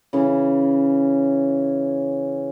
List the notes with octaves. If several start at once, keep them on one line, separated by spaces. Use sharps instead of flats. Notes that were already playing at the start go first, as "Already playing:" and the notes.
C#3 E3 C#4